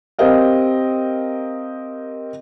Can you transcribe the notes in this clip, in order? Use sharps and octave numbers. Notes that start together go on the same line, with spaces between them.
C4 G4 A#4 D#5 F5